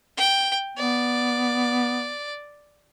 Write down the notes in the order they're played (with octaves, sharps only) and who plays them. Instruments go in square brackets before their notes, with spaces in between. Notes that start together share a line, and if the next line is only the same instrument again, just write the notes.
[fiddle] G5
[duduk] B3 [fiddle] D5